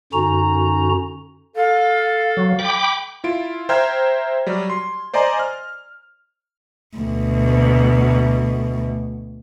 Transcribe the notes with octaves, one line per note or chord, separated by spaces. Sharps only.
F#2 D3 C#4 D#4 F#4 A#5
A4 F5
F#3
G5 B5 D6
E4 F4 D7
C5 E5 G5 A#5 F6 G#6
F#3 G3
C6
C5 D5 D#5 G#5 A#5 C6
F6
D2 B2